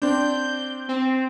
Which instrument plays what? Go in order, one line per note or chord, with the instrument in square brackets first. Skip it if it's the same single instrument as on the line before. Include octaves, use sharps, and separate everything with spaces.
[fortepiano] C4 D4 [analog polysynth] G6
[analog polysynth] C4